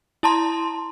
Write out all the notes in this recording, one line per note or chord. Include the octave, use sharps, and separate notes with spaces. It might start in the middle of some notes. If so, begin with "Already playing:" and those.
E4 A5 A#5 C6